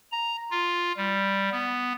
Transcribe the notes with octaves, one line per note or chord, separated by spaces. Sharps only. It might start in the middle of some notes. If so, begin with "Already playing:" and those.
A#5
F4
G3
B3